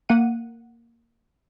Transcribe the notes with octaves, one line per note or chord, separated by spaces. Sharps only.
A#3 F#5 D#7